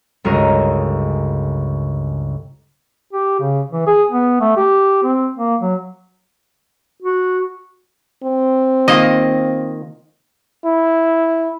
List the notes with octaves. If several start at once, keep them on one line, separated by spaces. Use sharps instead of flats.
G1 C#2 F#4 A#4 D#6
G4
C#3
E3
G#4
B3
A3
G4
C4
A#3
F#3
F#4
C4
D#3 A#3 F4 D#5
E4